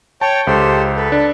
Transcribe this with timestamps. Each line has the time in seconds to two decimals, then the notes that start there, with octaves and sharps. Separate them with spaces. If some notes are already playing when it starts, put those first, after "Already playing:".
0.21 C#5 G5 A5
0.47 C#2 G4 A4 C5
0.96 A4 B4
1.12 D4